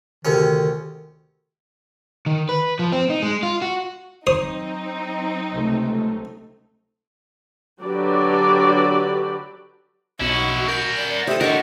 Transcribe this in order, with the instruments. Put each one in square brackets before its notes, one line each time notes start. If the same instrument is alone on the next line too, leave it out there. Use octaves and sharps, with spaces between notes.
[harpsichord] D2 C3 C#4 [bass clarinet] D#3
[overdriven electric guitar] D#3
B4
F3
C4
D#4
G#3
F4
F#4
[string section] F#3 C4 D#4 [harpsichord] C5 D#6
[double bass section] C#2 C3 A3
[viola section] D3 F#3 G4 B4 D5
[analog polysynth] B1 D#5 [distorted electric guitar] C#4 E4 [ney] F#4
[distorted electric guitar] A#4 F#5 [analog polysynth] B5 G6
[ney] D5
[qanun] G4 A4 [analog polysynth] C5 D#6 [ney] E5
[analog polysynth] D3 [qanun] F#4 C#5 [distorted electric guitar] G4 A#4 [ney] D#5